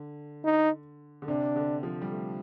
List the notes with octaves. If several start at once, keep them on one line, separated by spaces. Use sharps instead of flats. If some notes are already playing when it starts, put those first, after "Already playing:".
Already playing: D3
D#4
D3
C3 D4
D3
F3
G3
A3